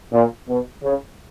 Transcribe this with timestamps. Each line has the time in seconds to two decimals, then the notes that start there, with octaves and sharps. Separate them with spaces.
0.13 A#2
0.48 B2
0.83 C#3